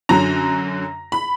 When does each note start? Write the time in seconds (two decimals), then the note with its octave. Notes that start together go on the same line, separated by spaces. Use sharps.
0.09 F#2 D3 F#3 A#5
1.12 B5